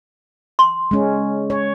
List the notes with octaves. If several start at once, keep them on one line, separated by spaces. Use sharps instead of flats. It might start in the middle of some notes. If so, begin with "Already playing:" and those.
C6
G#3 C#4
C#5